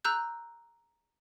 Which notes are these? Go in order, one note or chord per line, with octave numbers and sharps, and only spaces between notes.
A#5 E6 F#6 G6